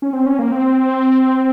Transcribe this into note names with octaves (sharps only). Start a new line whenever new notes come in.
C#4
C4
C#4
A#3
C4